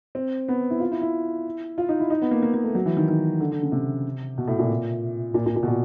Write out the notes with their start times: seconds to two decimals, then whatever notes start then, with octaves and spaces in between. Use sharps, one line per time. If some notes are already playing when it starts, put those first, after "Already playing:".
0.15 C4
0.48 B3
0.70 E4
0.80 F4
0.91 E4
1.01 E4
1.78 F4
1.89 D#4
2.00 E4
2.10 D#4
2.22 B3
2.31 A#3
2.43 A#3
2.54 A#3
2.64 A3
2.75 F#3
2.86 E3
2.97 D#3
3.08 D#3
3.40 D3
3.51 D3
3.62 C#3
3.72 C3
4.38 B2
4.48 A2
4.59 A#2
5.34 A#2
5.46 A#2
5.56 A#2
5.63 B2
5.67 A#2